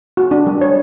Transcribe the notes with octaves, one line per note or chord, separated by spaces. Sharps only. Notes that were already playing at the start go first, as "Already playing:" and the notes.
F#4
D4
G3
C#5